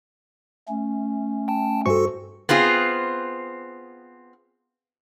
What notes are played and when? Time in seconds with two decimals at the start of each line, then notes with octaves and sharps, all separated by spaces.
0.69 A3 C#4
1.48 G5 A5
1.86 G2 F#4 A4 C5 C#6
2.49 B3 C4 F4 G#4